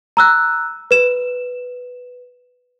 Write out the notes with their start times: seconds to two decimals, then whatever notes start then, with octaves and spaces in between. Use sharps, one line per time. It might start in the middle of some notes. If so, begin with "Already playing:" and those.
0.17 A#5 E6 F#6
0.91 B4 E7